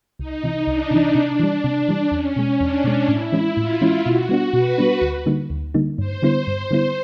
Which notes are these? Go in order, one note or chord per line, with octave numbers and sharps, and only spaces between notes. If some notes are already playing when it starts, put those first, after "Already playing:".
C2 D#4
C3 E3
C2 D4
C3 E3
C3 D4
E3 G3
C3 D4
E3 G3
E2 C#4
B2 G#3
E2 D4
B2 G#3
A2 E4
E3 G#3 C#4 E4
A2 F4
E3 G#3 C#4 E4
B2 F#4
G3 B3 D4
B2 B4
G3 B3 D4
D2
D3 G3 A#3 D#4
D2
D3 G3 A#3 D#4
G2 C5
D3 G3 B3 E4
G2 C5
D3 G3 B3 E4